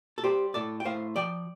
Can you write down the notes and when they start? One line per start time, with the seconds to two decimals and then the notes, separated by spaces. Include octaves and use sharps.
0.18 A4
0.23 G3 G4 C5
0.54 A2 A4 D5
0.80 G5
0.84 A2 C5 F5
1.16 F3 D5 G5